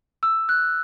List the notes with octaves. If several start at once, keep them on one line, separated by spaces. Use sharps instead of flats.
E6
F#6